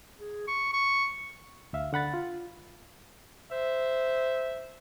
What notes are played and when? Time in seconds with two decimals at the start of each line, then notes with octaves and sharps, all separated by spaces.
0.19 G#4
0.48 C#6
0.73 C#6
1.73 D2 E5 F5
1.93 D3 F#5 B5 A6
2.14 F4
3.51 C5 E5